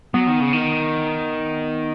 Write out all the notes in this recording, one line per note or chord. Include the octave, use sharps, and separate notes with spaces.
F#3 B3
D#3
C#3
D#3